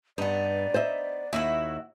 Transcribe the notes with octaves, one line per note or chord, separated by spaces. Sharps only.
G2 B3 D#4 D5
C5 D#5 E5
D#2 E4 F#4 E5